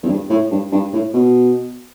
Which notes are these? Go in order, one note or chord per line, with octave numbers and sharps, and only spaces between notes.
E2
G2
A2
G2
G2
A2
B2